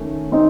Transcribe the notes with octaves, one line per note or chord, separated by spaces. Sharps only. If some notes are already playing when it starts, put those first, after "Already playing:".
Already playing: D#3 A3 C#4
C4 D#4